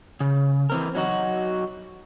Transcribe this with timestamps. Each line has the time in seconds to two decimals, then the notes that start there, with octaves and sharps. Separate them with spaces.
0.20 C#3
0.70 E3 C4 A#4
0.95 F#3 D#4 F#4